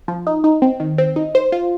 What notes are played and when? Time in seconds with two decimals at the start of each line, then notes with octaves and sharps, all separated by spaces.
0.08 F3
0.27 D#4
0.44 D#4
0.62 C4
0.80 D#3
0.98 C4
1.16 D#4
1.35 C5
1.52 F4